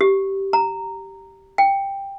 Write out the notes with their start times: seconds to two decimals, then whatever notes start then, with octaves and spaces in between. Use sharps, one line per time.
0.01 G4
0.53 A#5
1.58 G5